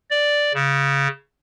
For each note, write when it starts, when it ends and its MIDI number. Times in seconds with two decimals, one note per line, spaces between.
0.10 0.52 74
0.54 1.08 49